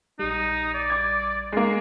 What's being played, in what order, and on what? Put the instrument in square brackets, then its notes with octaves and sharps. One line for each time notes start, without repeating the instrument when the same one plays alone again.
[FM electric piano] A#1 G3 [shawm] D#4
[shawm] D5
[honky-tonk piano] D6 G#6
G#3 A#3